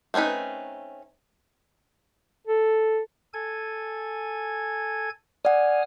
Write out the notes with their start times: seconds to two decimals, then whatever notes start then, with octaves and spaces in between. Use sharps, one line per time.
0.14 A3 C4 C#4 D#4 B4
2.47 A4
3.34 A4 G#5 G#6
5.45 D5 F#5 G#5 D#6 F6